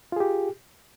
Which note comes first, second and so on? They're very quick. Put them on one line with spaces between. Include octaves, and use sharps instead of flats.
F4 G#4 G4